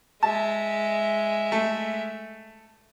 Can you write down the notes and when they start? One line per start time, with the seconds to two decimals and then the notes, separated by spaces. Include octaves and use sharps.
0.23 G#3 E5 A5
1.52 A3